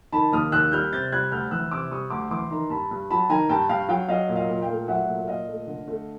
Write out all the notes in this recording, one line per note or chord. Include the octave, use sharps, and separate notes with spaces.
D#3 A5 B5
D#2 D#6 F6
D#2 E6 F#6
G3 F6 G6
C3 G6 A6
G3 F#6 G#6
D2 F6 G6
E3 E6 F#6
C3 D6 E6
G3 C#6 D#6
D2 C6 D6
E3 C6 D6
D#3 A#5 C6
G2 A5 B5
G2
F#3 A5 B5
D#3 G#5 A#5
G2 G5 A5
G2 F5 G5
F#3 F5 G5
F#3 D#5 F5
A#2
D#5 F5
A#2
F5 G5
A3
F#3 E5 F#5
A#2
A#2 D#5 F5
A3
D3
A3